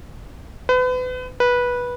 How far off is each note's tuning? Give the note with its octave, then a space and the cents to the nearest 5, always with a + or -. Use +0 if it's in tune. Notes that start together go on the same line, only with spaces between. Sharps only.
B4 +35
B4 -15